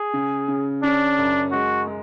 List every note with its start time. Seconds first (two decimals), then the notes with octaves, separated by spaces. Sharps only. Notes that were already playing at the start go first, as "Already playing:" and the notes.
Already playing: G#4
0.14 C#3
0.48 C#3
0.83 C#4 D4
1.18 F#2
1.52 G#3 F#4
1.87 G#3